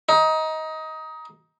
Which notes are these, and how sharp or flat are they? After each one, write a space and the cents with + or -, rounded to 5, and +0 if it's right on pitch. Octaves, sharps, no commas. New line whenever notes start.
D#4 +20